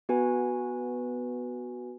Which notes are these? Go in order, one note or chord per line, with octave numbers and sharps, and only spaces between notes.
B3 F#4 B4 G#5